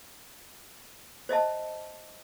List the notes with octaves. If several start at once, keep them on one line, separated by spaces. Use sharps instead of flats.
C5 D#5 E5 A5